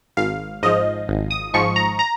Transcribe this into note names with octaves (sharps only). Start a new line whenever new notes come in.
G#1 F5
G#2 F3 D#5
G#1
D#6
G#2 F3 C#6
A#5
A#5